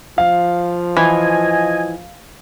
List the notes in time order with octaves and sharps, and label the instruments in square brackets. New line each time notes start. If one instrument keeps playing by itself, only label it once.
[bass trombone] F3 [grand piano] F5
[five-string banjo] E3 [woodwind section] D#5 G#5